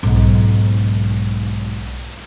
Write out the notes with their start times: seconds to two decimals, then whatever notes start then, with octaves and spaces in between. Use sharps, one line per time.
0.03 B1 G#2